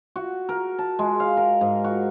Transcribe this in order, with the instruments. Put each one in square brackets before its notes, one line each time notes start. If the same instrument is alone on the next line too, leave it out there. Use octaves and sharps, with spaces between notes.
[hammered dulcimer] F#4
A#4
A5
G#3
F5
A#4
G#2
F#4